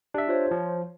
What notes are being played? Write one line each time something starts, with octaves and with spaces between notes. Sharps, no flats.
D4 G4 E5
F4 C5 C#5
F3